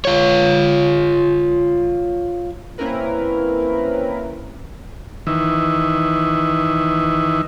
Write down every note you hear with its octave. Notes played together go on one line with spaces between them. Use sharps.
F4 C#5
A#3 C4 C#4 E4 A#4 B4
D#3 E3